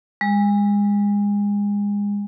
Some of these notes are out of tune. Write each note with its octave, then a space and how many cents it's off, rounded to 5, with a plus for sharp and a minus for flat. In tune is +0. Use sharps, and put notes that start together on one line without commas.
G#3 -30